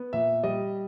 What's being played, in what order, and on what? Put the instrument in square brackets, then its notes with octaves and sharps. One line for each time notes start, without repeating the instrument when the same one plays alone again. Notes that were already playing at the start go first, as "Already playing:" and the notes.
Already playing: [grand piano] B3
A#2 E5
G3 D#5